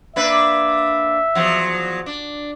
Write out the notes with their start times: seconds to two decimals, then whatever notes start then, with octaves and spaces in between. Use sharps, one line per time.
0.16 A#3 D4 B4 E5
1.35 E2 F3 F#3
2.06 D4